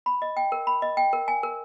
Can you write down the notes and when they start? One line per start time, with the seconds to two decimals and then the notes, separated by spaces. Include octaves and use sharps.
0.06 B5
0.22 D#5
0.37 G5
0.52 A#4
0.67 B5
0.82 D#5
0.97 G5
1.13 A#4
1.28 G#5
1.43 A#4